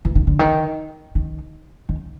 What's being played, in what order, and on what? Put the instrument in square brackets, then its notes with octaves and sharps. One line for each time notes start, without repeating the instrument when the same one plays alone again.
[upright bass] E3
D#3
D3
D#3
D#3
D#3